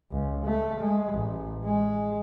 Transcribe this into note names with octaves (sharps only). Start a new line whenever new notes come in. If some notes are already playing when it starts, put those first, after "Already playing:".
C#2
A3
G#3
A1
G#3